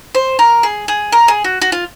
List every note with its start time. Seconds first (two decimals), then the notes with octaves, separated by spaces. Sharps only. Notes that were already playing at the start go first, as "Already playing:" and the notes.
0.15 C5
0.39 A#4
0.63 G#4
0.88 G#4
1.12 A#4
1.28 G#4
1.44 F#4
1.62 F#4
1.72 F4